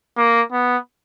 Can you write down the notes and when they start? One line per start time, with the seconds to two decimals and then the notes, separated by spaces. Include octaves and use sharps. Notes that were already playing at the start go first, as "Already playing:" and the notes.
0.17 A#3
0.52 B3